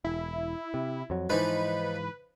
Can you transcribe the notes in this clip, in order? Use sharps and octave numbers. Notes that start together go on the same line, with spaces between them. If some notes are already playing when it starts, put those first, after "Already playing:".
E1 E4
C3
F2 F#3
G#2 E3 F3 D#4 B4